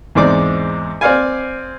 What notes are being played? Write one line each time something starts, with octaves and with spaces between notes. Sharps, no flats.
E2 G#2 G#3 C4 D5 D6
C4 D5 F5 G#5